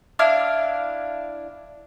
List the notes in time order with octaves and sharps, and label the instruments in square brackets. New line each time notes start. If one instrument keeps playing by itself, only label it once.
[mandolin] D4 E4 F5 F6